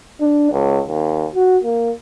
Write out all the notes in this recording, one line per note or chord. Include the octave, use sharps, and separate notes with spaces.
D4
C#2
D#2
F#4
A#3